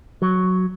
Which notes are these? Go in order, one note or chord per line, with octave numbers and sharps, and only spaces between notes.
F#3